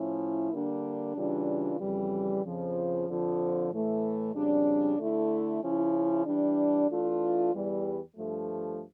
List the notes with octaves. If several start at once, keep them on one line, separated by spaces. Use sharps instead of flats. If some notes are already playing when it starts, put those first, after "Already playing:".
Already playing: A2 F3 C#4 E4
D3 G3 A#3 D4
C#3 E3 G3 D4 F4
F2 C#3 E3 G3
F2 C#3 F3
F2 D3 F3
A2 E3 A3
F2 C#3 G3 D4
D3 A3 E4
C#3 F3 C#4 E4
E3 G3 D4
E3 A3 D4 F4
E2 E3 G3
G2 F3 A3